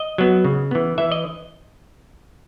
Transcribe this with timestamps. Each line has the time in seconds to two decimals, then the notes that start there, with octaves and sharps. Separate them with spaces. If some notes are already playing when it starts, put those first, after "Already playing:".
Already playing: D#5
0.18 F#3 B3
0.45 C#3
0.71 E3 B3
0.98 E3 E5
1.12 D#5